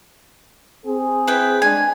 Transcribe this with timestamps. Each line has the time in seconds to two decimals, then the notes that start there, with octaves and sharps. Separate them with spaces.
0.85 C4 G#4
1.27 E4 B4 G5
1.62 G#3 D4 G#5